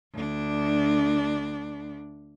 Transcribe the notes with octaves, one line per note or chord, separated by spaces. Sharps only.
D2 D4